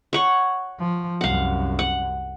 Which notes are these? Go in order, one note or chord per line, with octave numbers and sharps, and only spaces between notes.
C#5 F#5 C#6
F3
C2 F#2 F5 F#5
F#5